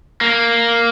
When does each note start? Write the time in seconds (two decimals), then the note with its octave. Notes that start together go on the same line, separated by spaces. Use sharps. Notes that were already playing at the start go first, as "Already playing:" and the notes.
0.21 A#3